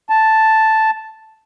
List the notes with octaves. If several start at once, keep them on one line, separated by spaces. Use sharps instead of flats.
A5